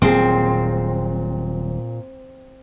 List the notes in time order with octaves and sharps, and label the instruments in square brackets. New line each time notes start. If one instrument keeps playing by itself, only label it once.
[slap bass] D#1 F#3 [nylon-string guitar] A#2 G#4 [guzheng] C4